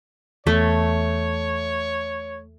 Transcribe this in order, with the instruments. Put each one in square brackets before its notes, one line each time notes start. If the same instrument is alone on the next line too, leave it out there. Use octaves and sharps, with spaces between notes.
[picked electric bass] E2 [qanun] A3 [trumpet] C#5